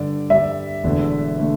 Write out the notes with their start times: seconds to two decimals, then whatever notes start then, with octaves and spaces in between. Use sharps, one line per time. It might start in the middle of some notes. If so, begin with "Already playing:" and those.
Already playing: G2 D3 G3 D5
0.30 G2 D3 G3 E5
0.83 E1 E2 D3 A3
1.39 D3 A3